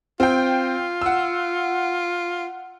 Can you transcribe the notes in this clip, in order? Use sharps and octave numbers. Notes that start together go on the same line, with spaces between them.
C4 F4 G5
F#5 E6